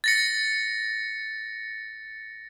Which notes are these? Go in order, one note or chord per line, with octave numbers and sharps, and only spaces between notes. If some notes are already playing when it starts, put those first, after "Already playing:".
A6 A#6 C#7